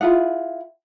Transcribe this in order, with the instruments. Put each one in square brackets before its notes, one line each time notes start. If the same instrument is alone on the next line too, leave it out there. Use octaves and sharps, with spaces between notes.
[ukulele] E4 F4 G#4 F#5